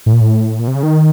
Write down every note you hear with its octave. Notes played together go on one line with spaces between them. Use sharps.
A2
A#2
A2
A#2
C3
C#3
D#3